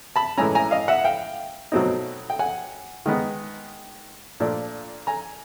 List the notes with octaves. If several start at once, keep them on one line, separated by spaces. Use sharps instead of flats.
A5 B5
A2 E3 G#3 C#4 G#5 A#5
G#5 A#5
D#5 F5
E5 F#5
F5 G5
B2 F#3 A3 C4 D#4
G5
F#5 G#5
D#3 G#3 B3 D#4
A#2 F3 A3 D4
G#5 A#5